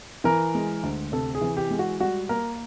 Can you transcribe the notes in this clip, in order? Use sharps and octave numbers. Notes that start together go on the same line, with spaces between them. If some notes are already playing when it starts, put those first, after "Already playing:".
E3 A#4
G#3
D2
C3 A4
G#4
E3
G4
G#3
F#4
G3 F#4
A#3 A#4